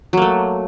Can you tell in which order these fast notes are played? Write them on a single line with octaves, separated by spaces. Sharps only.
F#3 A#3 A3